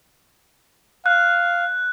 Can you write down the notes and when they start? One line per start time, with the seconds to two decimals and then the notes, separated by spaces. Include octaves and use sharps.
1.06 F5 F#6